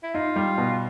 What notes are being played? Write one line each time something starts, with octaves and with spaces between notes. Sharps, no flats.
E4
D#4 F4
G3
B2